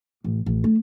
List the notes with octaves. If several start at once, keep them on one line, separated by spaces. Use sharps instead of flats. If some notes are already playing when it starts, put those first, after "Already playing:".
A1
A1
A3